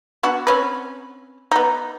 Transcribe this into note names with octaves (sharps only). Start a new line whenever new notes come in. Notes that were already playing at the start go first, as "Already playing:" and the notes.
B3 D4 F#4
C4 C#4 B4
B3 D#4